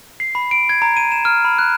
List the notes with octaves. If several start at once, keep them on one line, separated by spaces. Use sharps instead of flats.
C7
B5
D7
G#6
A#5
D#7
E7
F6
B5
F#6